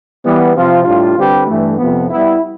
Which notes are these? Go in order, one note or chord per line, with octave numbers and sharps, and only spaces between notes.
E3 G3 B3
C3 F3 C4 F4
A2 G3 D4 F4
D3 G3 C4 G4 B4
G2 E3 A3
F2 C3 F3 B3
G3 B3 E4